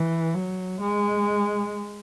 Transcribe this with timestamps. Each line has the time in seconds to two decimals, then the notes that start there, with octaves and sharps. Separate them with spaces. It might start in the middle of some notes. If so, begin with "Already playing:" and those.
Already playing: E3
0.34 F#3
0.81 G#3